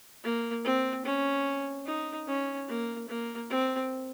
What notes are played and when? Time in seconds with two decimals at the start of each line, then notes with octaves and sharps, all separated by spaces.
0.24 A#3
0.65 C4
1.05 C#4
1.86 D#4
2.28 C#4
2.69 A#3
3.09 A#3
3.50 C4